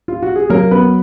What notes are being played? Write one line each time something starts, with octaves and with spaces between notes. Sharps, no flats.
F4
F#4
G#4
F#3 A#3 A#4
B3 B4